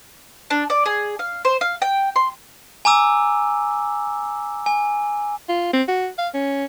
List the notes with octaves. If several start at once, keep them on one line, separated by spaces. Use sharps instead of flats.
D4
D5
G#4
F5
C5
F5
G5
C6
G#5 A#5 D6 E6
G#5
F4
C4
F#4
F5
C#4